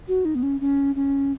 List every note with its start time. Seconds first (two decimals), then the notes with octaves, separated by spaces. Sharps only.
0.08 F#4
0.25 D#4
0.35 B3
0.43 C#4
0.61 C#4
0.95 C#4